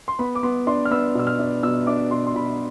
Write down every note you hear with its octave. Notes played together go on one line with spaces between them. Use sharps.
C6
B3 B5
D6
B3 C6
D4 C6
F6
B3 E6
B2 E6
F6
D4
B2 E6
D4 D6
B2 C6
C6
B2 B5